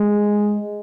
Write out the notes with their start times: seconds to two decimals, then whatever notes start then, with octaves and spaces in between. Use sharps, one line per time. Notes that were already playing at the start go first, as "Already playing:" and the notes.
Already playing: G#3